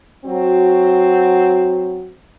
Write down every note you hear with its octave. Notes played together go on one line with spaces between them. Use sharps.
F#3 C4 F#4